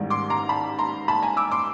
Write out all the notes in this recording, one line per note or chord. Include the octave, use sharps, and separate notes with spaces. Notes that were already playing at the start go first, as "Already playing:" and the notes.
Already playing: A1 G#2 D#3 G3
C6 D6
A#5 C6
A5 B5
A#5 C6
A5 B5
G#5 A#5
D6 E6
C6 D6